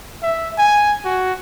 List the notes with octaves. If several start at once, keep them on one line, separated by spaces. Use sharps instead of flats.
E5
G#5
F#4